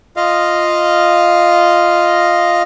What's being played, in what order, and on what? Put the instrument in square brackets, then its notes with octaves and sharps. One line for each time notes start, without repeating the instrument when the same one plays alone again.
[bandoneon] F4 D#5 F5